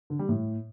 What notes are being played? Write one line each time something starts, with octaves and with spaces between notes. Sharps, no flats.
D3
G3
A2